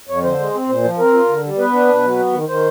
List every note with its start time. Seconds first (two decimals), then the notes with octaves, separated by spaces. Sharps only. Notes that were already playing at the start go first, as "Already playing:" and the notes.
0.09 F2 C#5
0.24 D3 C5
0.39 G#3
0.54 C4
0.69 A#2 C5
0.84 F3
0.98 C4 A#4
1.13 F4
1.29 D3
1.44 G3
1.58 B3 B4
1.73 D4
1.89 B2
2.03 F#3
2.18 B3
2.33 D#3
2.48 D#3 C5